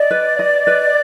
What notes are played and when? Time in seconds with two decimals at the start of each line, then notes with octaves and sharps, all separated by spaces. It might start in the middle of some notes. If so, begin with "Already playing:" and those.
Already playing: D5 D#5
0.11 B4
0.39 D#5
0.67 B4